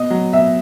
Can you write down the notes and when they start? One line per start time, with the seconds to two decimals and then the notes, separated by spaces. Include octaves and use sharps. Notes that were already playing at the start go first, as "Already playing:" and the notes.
Already playing: B2 D#5
0.10 F#3
0.32 B2 E5